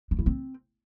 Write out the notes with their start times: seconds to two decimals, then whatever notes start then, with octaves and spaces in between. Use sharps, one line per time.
0.11 D4
0.19 E4
0.26 C4